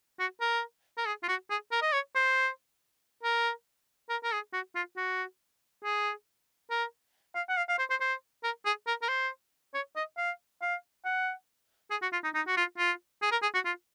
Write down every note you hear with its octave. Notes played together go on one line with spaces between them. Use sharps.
F#4
A#4
A#4
G#4
F4
F#4
G#4
A#4
D#5
C#5
C5
A#4
A#4
A#4
G#4
F#4
F4
F#4
G#4
A#4
F5
F#5
F5
F5
C5
C5
C5
A#4
G#4
A#4
A#4
C5
C#5
D#5
F5
F5
F#5
G#4
F#4
F4
D#4
D#4
F#4
F4
F4
G#4
A#4
G#4
F#4
F4